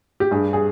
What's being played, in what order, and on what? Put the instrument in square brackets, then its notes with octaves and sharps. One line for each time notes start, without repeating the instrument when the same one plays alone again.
[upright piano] G4
G2 G#4
G#4